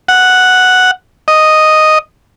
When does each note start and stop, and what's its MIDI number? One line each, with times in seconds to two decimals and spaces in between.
0.08 0.91 78
1.28 1.98 75